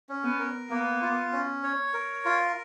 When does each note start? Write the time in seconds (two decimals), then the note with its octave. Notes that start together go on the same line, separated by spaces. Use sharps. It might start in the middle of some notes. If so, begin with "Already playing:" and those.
0.09 C#4
0.24 B3
0.39 A#4
0.70 A#3 B3
1.01 F4
1.32 C#4
1.63 C#5
1.94 A#4
2.25 F4